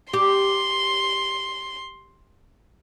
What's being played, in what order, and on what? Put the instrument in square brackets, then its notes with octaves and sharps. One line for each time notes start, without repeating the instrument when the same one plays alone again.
[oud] G4 [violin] C6